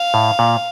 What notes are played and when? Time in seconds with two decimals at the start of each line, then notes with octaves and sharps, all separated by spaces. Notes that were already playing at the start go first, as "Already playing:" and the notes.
Already playing: F5
0.14 A2
0.39 A#2